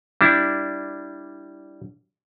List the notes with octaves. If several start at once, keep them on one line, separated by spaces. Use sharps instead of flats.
G3 D4 E4